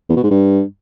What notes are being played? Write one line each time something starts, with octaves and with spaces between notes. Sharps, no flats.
E2
B2
G#2
G2